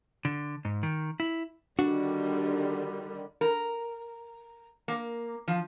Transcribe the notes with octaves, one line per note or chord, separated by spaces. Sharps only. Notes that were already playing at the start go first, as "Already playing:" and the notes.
D3
G#2
D#3
E4
D3 D#3 G3 D4 F#4
A#4
A#3
F3